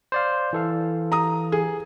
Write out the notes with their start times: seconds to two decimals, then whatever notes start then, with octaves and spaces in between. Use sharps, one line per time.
0.12 C5 D5 F5
0.53 E3 A4 F5
1.12 A#5 D#6
1.52 G#4